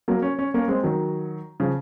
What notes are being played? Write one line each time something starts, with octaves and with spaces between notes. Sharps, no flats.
F#3 A#3
C#4
C#4
A#3 C#4
G#3 C4
D#3 F#3
C#3 F3